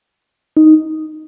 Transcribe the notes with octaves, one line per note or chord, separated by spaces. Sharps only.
D#4